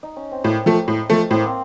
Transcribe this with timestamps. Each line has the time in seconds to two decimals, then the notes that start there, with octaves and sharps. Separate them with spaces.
0.03 D#4
0.16 C#4
0.31 C4
0.44 A2 A#3
0.66 F3 A3
0.88 A2
1.10 F3 A3
1.31 A2 C4
1.39 A#3
1.46 C4